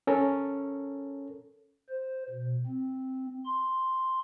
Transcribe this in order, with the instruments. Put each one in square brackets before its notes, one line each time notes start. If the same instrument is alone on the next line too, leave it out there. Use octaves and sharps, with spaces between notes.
[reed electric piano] C#4 A4 A#4 C#5
[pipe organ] C5
B2
C4
C6